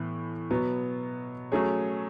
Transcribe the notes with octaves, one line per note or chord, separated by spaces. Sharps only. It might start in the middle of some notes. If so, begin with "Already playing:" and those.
Already playing: A2 E3 B3
B2 F#3 B3
F#3 A3 C#4 G#4 C#5